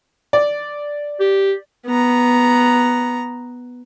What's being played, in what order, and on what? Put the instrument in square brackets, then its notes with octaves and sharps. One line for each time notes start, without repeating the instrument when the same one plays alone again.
[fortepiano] D5
[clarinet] G4
[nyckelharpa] B3 A#5